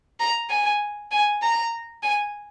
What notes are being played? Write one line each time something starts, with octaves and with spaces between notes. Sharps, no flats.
A#5
G#5
G#5
A#5
G#5